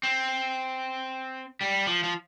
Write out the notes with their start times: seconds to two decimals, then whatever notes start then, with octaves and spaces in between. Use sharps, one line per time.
0.03 C4
1.61 G3
1.87 F3
2.04 F3